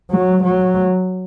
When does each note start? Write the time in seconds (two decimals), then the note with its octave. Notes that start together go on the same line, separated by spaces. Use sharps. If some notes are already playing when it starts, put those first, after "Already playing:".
0.11 F#3
0.44 F#3